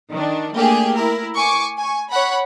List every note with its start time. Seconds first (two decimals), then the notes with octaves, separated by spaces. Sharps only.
0.11 D#3 D4
0.54 A3 A#3 D4 G4 G#4
0.93 E4 A#4
1.35 G#5 C#6 D6
1.79 G#5 C#6
2.10 C#5 F#5 B5